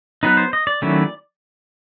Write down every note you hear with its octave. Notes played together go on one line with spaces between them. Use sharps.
F#3 B3 D#4 B4
C5
D#5
D5
D#3 F#3 A3 C#4 E4